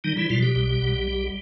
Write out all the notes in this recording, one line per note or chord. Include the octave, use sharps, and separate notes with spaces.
D#3 G3 D#4
E3 E4
B2 F3 F4
G3 G4
B1
B1
G3